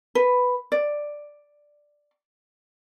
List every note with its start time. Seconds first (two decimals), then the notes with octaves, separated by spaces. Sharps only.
0.15 B4
0.72 D5